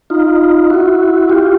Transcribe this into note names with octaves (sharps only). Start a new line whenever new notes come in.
D#4 F4
E4 F#4
F4 G4